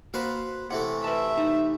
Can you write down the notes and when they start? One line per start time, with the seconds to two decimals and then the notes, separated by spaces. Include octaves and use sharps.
0.14 A#3 F#4 B4 C5 F5
0.71 C3 E3 A3 F#5
1.04 B4 E5 A5
1.38 D#4 C5